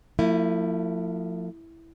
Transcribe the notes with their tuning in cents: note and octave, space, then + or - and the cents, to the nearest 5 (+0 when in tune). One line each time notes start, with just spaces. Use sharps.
F3 +25 A3 +45 E4 +0